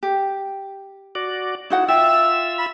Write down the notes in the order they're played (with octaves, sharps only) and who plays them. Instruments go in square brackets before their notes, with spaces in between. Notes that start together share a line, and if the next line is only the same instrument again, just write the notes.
[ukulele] G4
[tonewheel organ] F#4 D5
[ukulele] D#4 F#4 F#5 [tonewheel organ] E4
[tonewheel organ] F4 E6 [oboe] E5 [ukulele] G5
[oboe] B5